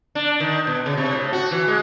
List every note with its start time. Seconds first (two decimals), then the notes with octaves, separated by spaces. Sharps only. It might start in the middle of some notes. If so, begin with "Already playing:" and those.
0.15 D4
0.40 D#3
0.67 B2
0.86 C#3
0.97 C3
1.13 A2
1.33 F#4
1.51 E3
1.68 G#3